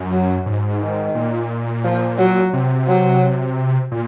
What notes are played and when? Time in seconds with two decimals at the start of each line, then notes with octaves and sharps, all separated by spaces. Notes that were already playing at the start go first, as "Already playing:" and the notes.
Already playing: F#2
0.11 F#3
0.46 G#2
0.81 D#3
1.15 A#2
1.84 F3
2.18 F#3
2.53 C3
2.87 F#3
3.91 A#2